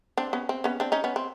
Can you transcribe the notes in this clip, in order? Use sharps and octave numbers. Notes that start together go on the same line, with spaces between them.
C4 D4
B3 C#4
C4
B3 C#4
C4 D4
C#4 D#4
B3 C#4
C4